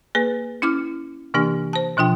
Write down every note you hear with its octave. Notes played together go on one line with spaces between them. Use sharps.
A#3 G#4 B4
C#4 E4 D6 F6
C3 E3 A#3 D4 G4
C5 A5
B2 F3 D4 F4 G5